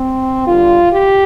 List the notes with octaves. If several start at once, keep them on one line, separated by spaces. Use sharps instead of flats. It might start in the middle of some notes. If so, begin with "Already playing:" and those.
Already playing: C4
G2 D3 G3 F4
G4